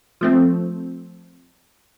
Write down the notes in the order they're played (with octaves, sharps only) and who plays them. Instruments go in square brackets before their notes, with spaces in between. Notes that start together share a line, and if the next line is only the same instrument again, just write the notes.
[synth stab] F3 A3 C4